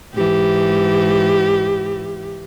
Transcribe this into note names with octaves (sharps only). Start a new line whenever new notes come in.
G#2 E3 G4